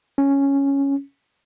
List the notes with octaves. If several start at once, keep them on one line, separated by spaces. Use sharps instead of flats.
C#4